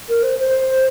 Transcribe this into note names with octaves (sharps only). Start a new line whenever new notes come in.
A#4
C5
C5